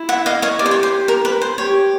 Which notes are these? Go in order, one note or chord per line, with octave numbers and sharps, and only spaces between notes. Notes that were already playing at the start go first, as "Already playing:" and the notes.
Already playing: E4
E5 F#5
D#5 F5
C#5 D#5
G4 D5
C5
C#5
C5
A#4
B4
C5
G4 C#5